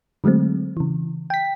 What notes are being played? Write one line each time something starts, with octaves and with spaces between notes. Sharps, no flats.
D3 F#3 G#3 A3 C4
C#3 E3
G5 B6